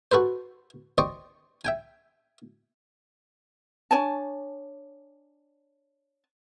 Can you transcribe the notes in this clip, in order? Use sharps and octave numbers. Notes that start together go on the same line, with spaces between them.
F#4 A4 B4 C5
C5 D5 D#5 G5 C#6
E5 G5 G#5
D4 C#5 G#5 A5